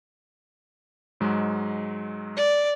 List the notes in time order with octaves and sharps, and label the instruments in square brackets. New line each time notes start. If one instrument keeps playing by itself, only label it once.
[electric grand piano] G#2 F#3 G#3
[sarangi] D5